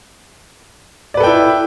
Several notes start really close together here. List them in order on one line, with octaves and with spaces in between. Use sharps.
D5 B4 A4 G5 E4